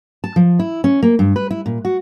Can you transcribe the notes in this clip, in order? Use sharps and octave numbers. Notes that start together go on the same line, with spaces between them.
A5
F3
E4
C#4
A#3
G2
B4
E4
A#2
F#4